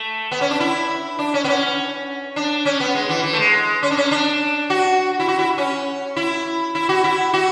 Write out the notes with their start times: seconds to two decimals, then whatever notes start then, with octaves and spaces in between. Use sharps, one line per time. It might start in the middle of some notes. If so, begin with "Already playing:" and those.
Already playing: A3
0.31 B3
0.41 C#4
0.50 D4
0.60 E4
1.19 D4
1.34 C#4
1.44 B3
1.49 C#4
2.36 D4
2.65 C#4
2.80 B3
2.95 G#3
3.09 E3
3.23 E3
3.33 A3
3.39 G#3
3.83 C#4
3.90 D4
3.97 C#4
4.11 D4
4.70 F#4
5.20 E4
5.28 F#4
5.39 E4
5.58 C#4
6.16 E4
6.75 E4
6.89 F#4
7.04 E4
7.33 F#4